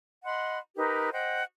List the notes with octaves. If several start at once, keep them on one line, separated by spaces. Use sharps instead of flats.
D#5 F#5 B5 C6
D#4 G4 A#4 B4
C5 D#5 F#5 G5